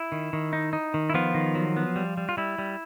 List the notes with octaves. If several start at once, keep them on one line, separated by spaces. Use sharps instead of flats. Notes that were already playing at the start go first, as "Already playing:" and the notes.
Already playing: E4
D#3
D#3
D#4
D#4
D#3
E4
F3 B3 F4
D#3
F#3
B3
G3
G3
F4
G3 E4
G3